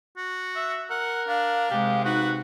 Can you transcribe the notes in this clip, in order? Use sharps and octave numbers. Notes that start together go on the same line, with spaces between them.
F#4
E5
A#4 F#5
D4 F5
C3 G#3 G4
D#4 F#4 B4